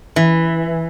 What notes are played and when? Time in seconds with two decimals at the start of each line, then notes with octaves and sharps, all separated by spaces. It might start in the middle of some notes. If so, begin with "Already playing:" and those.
0.16 E3